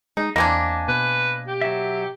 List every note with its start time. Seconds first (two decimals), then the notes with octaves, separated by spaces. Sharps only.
0.17 G#3 D#4
0.36 E2 A#3 C4 D4 D#5 G#5
0.88 B2 B4
1.47 G4
1.61 F#3 E5